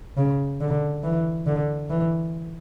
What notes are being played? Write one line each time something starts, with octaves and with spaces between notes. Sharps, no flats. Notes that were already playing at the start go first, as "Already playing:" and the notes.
C#3
D3
E3
D3
E3